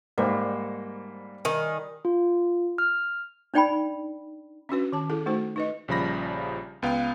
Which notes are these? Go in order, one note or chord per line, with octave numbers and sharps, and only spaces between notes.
G#2 G3 A#3 C5
D#3 G#5
F4
F6
D4 D#4 D5 G5 G#5 B5
C#4 D4 F#4 B4
D#3 A5
E4 G#4 A4
A3 D#4 F#4 C5
D#4 B4 D#5
A#1 C#3 F3 G3 B5 A#6
C#2 B3 F5 G5